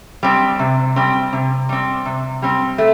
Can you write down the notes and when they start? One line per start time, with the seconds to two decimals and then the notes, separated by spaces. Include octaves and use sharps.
0.23 G3 C4
0.59 C3
0.96 G3 C4
1.33 C3
1.69 G3 C4
2.05 C3
2.42 G3 C4
2.78 A3